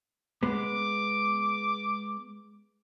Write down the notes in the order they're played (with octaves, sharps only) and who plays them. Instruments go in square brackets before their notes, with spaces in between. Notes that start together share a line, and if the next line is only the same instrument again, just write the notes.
[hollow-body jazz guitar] G#3 B3 [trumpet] D6